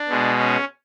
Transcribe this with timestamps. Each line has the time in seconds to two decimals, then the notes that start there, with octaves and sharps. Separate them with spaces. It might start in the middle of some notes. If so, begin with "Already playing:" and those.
Already playing: D4
0.09 B2 G#3
0.38 C#4